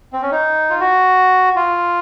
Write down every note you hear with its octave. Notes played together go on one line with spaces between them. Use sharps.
C4
C#4
D#4
F4
F#4
F4